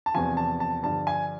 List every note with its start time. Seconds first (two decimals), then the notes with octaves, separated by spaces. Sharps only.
0.06 A5
0.14 E2 C3 F3 G#5
0.37 A5
0.60 A5
0.83 G2 D3 F3 A5
1.07 G#5